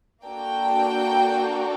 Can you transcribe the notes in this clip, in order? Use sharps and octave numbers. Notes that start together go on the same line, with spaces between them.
A#3 D4 F#4 A4 G5